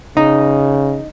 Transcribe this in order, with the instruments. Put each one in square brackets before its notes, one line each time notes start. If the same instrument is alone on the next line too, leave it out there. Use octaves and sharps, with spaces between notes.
[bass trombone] C#3 [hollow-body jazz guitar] D#4